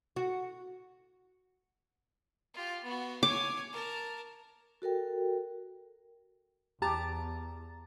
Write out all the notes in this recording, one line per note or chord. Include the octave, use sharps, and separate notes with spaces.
F#4
F4 G4
B3 F#4
C#5 G#5 D6
A#4 A5
F#4 A4 A#4 G5
E2 G4 A5 A#5 A6